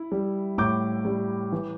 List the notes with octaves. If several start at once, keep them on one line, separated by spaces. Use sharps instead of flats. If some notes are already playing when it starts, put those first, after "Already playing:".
Already playing: E4
G3
A2 D6 G6
G3
E3